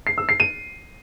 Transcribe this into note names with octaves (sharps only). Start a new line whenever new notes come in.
C7
E6
C7
D#7